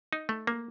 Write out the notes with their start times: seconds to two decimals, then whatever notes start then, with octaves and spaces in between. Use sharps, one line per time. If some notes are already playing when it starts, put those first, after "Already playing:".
0.13 D#4
0.29 A3
0.47 A#3